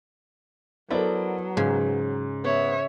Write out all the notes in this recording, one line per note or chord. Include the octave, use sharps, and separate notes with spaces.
F#3 B3 E4 A4 A#4 C5 D5
G#2 C#3
B3 C#5 E5